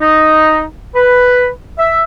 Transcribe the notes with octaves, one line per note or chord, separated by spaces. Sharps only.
D#4
B4
E5